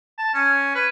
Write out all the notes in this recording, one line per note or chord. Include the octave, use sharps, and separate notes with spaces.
A5
C#4
B4